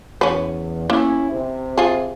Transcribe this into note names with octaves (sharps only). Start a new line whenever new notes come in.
E2 C#4 B4
A#3 C#4 E4
C3
F4 G#4